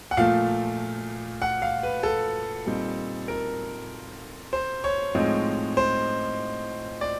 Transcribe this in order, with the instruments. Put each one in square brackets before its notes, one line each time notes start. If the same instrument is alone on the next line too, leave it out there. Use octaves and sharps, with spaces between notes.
[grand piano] F#5
A#2 F3 A3 F5
F#5
F5
B4
A4
A#2 G3 C4 D#4
A#4
C5
C#5
A2 F3 G#3 C4 D#4
C5
D5